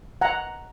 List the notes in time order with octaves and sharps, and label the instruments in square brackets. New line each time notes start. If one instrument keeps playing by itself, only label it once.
[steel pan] F#5 A#5